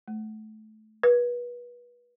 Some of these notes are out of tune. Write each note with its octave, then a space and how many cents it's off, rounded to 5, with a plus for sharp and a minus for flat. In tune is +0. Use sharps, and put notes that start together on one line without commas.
A3 -20
B4 -30